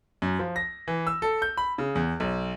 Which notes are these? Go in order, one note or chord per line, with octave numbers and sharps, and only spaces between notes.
F#2
F3
A#6
E3
E6
A4
G6
B5
C#3
E2
B1